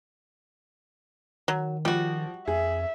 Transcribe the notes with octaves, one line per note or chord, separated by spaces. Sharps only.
D#3 F#3
F3 G3 F#4
F2 G#4 E5